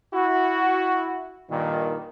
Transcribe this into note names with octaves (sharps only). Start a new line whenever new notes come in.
E4 F#4
G2 A#2 D#3